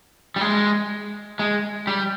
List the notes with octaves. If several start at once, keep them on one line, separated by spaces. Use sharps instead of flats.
G3
G#3
G#3
G3